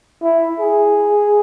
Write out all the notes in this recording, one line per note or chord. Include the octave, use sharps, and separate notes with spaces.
E4
G#4